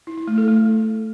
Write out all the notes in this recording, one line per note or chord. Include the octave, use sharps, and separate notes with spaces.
E4
E4
A3
A4
A3